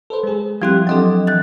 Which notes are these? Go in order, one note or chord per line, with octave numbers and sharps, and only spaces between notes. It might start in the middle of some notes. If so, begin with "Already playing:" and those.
A4 B4 C5
G#3 G#4
F3 G3 C4 E4 G4 F#6
F#3 C4 D4 A4 D#5 G5
E3 F#6 A6